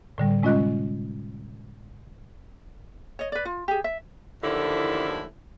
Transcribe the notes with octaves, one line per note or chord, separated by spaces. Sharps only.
A2 D3 G3
C3 G#3 C#4 F4 D#5 F#6
C#5 D#5
B4 D5
F4
G4 G#4
E5
D#2 A2 D3 E3 F3 E4